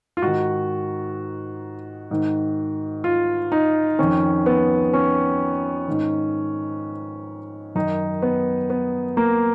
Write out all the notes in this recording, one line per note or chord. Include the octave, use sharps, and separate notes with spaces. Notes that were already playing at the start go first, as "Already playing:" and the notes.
F4
G#2 D#3 F#4
G#2 D#3
F4
D#4
F2 D#3 C#4
B3
C#4
G#2 D#3
F#2 D#3 D#4
B3
B3
A#3